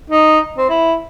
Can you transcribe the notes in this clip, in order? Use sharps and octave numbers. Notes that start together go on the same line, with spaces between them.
D#4
C4
E4